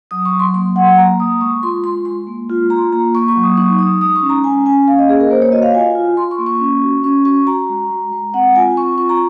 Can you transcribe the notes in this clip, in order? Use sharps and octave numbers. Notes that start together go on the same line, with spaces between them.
F#3 D#6
C#6
F#3
C6
A#3 C6
F#3 F#5
A#3 A#5
A#3 D#6
G#3 C#6
F4 C6
G#3 C6
G#3 C6
A#3
F4
F4 A#5
A#3 A#5
A#3 C#6
C#6
F#3
D#6
D#4 C#6
D#4 D#6
G#3 D#6
C#6
C#4
A#5
C#4 G#5
C#4 G#5
A#3 F5
D#5
A#3 G#4
A#4
A#3 C5
C#5
F#4 D#5
F5
F4 G#5
F4
F4 C6
C#6
A#3
C#6
C#4
F#4
C#4 C#6
F#4 C#6
F#4 A#5
G#3
G#3
G#3
C4 F#5
F4 G#5
C4 C#6
F4 C#6
A#5